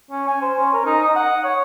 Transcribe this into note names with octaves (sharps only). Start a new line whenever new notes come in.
C#4
G#5
C5
C#4
A#4
D#4
D#5
F#5
C#5